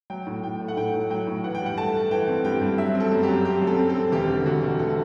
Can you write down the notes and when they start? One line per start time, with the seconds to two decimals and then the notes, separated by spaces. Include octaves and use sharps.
0.10 F#3 G5
0.27 A2
0.43 A2 G5
0.60 A3
0.68 F#5
0.77 A2 G5
0.94 F#3
1.10 F#3 G5
1.27 A2
1.44 E3 F#5
1.55 G5
1.61 G2 F#5
1.77 A3 A5
1.94 A3
2.11 E3 G5
2.28 C4
2.45 G2 G5
2.62 G2
2.78 F#3 E5
2.95 C4
3.00 A4
3.12 F#2
3.23 G4
3.29 F#2
3.45 C4 G4
3.62 F#2
3.67 A4
3.79 C4
3.90 A4
3.95 C4
4.12 E1 G4
4.29 D3
4.46 E1 F#4
4.62 E1
4.79 A3 A4